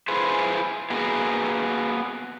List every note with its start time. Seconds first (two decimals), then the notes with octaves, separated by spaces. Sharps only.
0.08 E4 F4 G#4 B4 C5
0.90 A#3 B3 F#4 G#4